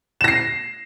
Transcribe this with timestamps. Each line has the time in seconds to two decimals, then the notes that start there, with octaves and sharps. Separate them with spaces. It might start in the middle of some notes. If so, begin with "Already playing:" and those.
0.21 E7
0.24 A#6
0.28 C7